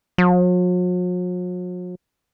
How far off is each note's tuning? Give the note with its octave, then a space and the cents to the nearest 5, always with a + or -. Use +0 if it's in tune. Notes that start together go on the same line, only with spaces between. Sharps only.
F#3 -45